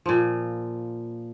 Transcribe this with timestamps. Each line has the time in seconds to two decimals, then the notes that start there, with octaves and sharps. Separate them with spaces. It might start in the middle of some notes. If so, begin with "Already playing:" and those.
0.06 A#2 F3